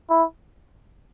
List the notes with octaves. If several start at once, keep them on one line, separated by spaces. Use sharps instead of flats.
E4